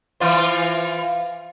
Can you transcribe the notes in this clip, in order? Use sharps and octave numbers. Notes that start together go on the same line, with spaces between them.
E3 F4 C5